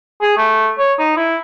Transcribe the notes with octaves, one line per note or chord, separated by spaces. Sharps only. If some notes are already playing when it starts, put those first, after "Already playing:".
G#4
A3
C#5
D#4
E4